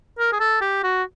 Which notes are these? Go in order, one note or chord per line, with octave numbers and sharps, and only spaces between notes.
A#4
G#4
A4
G4
F#4